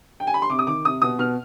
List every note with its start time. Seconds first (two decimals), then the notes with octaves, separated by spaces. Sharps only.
0.20 G5
0.27 G#5
0.34 B5
0.42 C6
0.49 C3 D6
0.59 D#6
0.67 D#3 D6
0.85 C3 D#6
1.02 B2 D#6
1.19 B2 F6